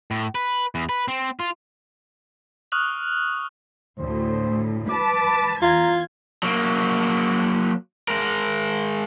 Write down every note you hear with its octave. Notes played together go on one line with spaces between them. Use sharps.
A2
B4
E2
B4
C4
F4
C#6 D#6 F6 F#6 F7 F#7
D2 A2 C5
B4 A5 D6
E2 F4 A#5 G#6
F#3 A#3
G#3 A#4